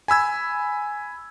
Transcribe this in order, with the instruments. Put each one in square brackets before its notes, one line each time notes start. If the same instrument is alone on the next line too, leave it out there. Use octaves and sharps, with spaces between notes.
[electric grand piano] G#5 B5 E6 G#6